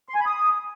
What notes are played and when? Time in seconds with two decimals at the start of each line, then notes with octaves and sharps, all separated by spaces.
0.09 C6
0.15 G#5
0.20 B5
0.26 D#6